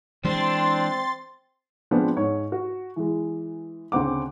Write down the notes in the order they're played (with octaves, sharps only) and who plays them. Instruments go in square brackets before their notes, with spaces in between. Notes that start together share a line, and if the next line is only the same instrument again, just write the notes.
[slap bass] E3 G#3 [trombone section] C4 [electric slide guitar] D4 [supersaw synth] C6 A6
[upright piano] F3 G#3 B3 C4 D4 F4
G#2 C#5
F#4
E3 G#3
D2 C#3 C4 F#5 D6